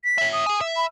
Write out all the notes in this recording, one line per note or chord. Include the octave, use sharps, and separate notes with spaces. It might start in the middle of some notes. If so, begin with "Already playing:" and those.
B6
C#5 E5
D#6
G#4 G#5
E5
B5